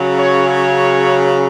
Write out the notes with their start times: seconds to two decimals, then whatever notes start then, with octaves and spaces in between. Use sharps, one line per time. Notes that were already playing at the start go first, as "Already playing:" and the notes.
Already playing: C#3 F#3
0.18 C#5
0.49 C#5